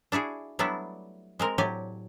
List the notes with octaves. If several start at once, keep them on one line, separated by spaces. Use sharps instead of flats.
D4 E4 F#4 G#4
F#3 G3 A3 B3 D4 E4
G#3 C4 A#4
A2 F#3 G4 D5 G#5